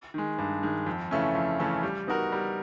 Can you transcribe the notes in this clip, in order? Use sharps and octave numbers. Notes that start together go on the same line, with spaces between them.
D#3 G#3
G2
D#3 G#3
F2
C#3 E3 A3 C#4
F2
C#3 E3 A3 C#4
G3
B3 D#4 F#4 A#4
G3